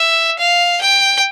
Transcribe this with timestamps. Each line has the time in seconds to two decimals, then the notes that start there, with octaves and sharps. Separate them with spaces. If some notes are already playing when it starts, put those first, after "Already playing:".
Already playing: E5
0.39 F5
0.81 G5